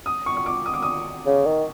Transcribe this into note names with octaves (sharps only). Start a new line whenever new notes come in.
D#6
C#6
C#6
D6
D#6
D6
D#6
C#3
D#3